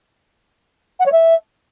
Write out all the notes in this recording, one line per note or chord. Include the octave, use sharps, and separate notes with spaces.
F#5
C#5
E5